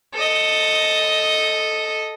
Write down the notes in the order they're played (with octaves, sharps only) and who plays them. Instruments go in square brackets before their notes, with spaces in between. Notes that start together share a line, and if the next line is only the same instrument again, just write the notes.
[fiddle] A4 D#5